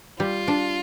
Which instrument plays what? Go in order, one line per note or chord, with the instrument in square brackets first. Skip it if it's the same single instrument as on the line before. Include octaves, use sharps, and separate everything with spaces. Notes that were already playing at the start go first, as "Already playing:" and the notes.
[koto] G3 [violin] F4
[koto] D4